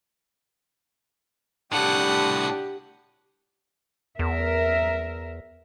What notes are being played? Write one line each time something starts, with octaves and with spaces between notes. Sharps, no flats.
C2 A2 D4 G4 F#5 D#6
E2 A#4 E5